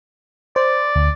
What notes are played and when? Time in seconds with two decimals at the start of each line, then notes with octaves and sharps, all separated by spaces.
0.56 C5 D5
0.96 D2